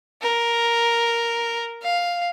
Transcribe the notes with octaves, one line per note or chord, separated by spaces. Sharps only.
A#4
F5